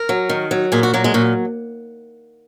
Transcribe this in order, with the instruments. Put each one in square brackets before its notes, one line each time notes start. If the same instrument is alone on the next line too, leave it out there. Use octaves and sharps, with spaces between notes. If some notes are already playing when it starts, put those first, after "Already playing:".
Already playing: [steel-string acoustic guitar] A#4
F#3
D#3
F#3
A#2 G#4
F#4
F#3 A#3
G#3
A#2 F#4